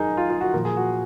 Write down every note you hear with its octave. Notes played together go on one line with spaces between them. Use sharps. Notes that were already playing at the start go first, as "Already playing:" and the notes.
Already playing: F#2 D#4 G#4 A#4
F4
F4
F#4
A#2 F3 A#4
G#4
F#4